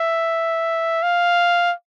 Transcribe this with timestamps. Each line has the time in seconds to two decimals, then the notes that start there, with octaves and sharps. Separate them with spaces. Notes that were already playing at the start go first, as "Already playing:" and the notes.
Already playing: E5
1.03 F5